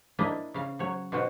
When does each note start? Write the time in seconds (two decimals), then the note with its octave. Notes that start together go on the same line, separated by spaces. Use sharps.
0.19 A#3 D4 E4 D#5
0.54 C#3 F5
0.79 F#3 C#5
1.12 B2 F4 F#4 C5 G5